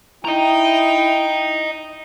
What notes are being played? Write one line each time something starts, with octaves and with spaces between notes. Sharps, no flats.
E4 D#5 G5 A#5